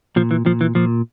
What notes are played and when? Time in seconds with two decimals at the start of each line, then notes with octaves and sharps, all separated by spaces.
0.16 A#2 F3
0.31 E3
0.46 A#2 F3
0.61 E3
0.75 A#2 F3